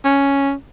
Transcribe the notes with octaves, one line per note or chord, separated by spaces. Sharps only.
C#4